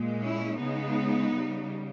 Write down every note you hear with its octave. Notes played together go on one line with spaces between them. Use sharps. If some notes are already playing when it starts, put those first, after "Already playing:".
Already playing: A#2 G#3
C#4 E4
C#3 G#3 B3 D#4
C#3 G3